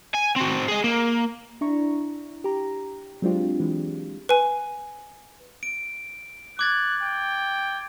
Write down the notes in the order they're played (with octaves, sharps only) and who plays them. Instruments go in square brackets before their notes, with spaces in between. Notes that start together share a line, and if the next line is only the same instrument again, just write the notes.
[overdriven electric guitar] G#5
C4 F#4
G#4 D#5
A#3
[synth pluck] D4 E4 A#5 C#6
G4 A#5
F#3 G#3 C4 D4 F4 G4
E3 G#3
[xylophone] B4 G#5
[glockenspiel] D7
[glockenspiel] D6 G#6 A6 [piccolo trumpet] F#6
[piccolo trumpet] G5